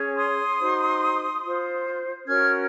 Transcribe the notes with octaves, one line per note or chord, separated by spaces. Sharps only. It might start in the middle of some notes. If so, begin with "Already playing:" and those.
Already playing: C#4 G#4 C#5
C6 D#6
D#4 F#4 C5
F4 C5
C#4 F#4 A#4 C#5 F6 G#6